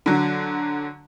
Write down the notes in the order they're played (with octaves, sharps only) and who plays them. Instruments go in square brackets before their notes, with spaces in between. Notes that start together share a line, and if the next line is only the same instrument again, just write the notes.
[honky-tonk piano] D3 F#3